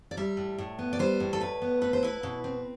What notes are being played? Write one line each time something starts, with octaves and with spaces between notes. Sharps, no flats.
D5
G3 E5
A2
A2
B3
D5
G3 C5
A2
A4
A2 B4
B3
A3 B4
C5
E4 B4
B2
C4